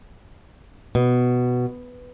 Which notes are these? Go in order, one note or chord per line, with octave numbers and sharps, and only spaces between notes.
B2